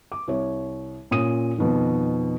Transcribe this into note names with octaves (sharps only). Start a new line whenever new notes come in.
D6
C2 C#5
A#2 C#4 D#6 D#7
F2 B2 D#3